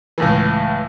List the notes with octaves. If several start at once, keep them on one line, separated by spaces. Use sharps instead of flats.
C#2 A2 E3